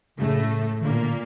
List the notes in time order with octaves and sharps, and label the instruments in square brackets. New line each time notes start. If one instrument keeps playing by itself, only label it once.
[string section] A2 A3 [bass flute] C#3
[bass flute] D#3
[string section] A#2 A#3 [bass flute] D3
[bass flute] D3